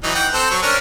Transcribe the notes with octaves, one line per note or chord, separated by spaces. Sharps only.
E3 F#3 D#4
F#5 G5
C4 A4 C5
F#3 C#6
C#4 D4 A#4